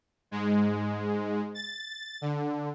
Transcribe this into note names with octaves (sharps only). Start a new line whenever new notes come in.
G#2 G#3
A6
D3